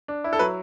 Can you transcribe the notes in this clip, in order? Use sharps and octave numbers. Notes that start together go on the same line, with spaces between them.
D4
E4
A4
F#3 B4